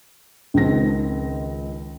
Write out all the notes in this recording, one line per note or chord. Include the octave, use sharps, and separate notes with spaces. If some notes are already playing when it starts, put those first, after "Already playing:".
C#2 D#3 C4 A#6